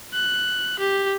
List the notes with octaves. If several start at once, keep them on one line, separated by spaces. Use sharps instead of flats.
F#6
G4